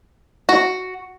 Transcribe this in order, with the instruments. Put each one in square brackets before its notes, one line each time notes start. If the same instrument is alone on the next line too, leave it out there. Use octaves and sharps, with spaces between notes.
[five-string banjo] F#4